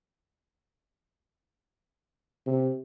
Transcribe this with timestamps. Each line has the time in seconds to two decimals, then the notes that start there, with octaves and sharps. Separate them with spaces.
2.46 C3